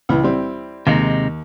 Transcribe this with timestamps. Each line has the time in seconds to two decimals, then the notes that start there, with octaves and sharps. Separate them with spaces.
0.09 C#2 E3
0.23 G3 C4 E4
0.87 D#2 C3 G#3 D#4